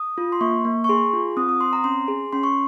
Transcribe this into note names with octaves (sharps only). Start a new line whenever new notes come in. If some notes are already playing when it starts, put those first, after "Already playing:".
Already playing: D#6
F4
C6
A#3 C#6
A#3
C#6
G#4 C6
F4
C4 D#6
D#6
C4 C6
A#5
C#4 C6
G#4
C#4 C6
C#6